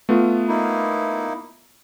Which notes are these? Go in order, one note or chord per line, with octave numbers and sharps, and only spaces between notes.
A3 B3 F4
A#3 D#4 E4